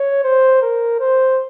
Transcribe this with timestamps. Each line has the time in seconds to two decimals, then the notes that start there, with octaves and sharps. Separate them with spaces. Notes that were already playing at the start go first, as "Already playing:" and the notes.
Already playing: C#5
0.24 C5
0.62 A#4
1.00 C5